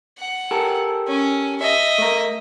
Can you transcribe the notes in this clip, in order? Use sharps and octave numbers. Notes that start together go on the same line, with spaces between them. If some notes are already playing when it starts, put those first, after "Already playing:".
F#5
G4 A4 A#4
C#4
D#5 E5
A3 A#4